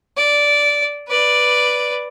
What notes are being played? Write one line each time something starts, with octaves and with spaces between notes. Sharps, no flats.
D5
B4 D5